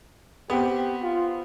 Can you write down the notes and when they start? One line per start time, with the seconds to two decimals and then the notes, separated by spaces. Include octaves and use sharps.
0.50 B3 C4 G4
1.02 F4